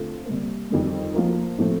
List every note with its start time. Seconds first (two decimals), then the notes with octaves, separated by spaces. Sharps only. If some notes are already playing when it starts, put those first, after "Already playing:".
Already playing: D3 A3 C4 F4 A4
0.26 C3 G3 A#3
0.70 F2 D#3 G3
1.14 F3 A#3 F4 A#4
1.58 A2 F3 A3 C4